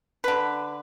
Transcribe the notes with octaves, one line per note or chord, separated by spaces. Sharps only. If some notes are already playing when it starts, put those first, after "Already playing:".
D3 B4